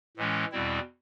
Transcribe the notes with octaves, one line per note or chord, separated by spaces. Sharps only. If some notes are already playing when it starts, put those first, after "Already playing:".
A2 E3 G#3 C#4
E2 B2 G3 C4 E4